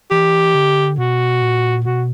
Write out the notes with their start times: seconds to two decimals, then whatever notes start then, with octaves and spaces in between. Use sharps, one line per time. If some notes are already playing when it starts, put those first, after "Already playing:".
0.11 E3 G4
0.55 D3
0.98 B2 F#4
1.42 A#2
1.85 B2 F#4